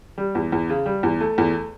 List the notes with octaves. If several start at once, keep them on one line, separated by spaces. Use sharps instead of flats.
G3
E2
E2
C#3
G3
E2
A3
E2